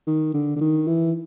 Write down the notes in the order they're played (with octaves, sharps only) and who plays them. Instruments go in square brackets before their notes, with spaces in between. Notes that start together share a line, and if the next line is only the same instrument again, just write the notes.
[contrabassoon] D#3
D3
D3
D#3
E3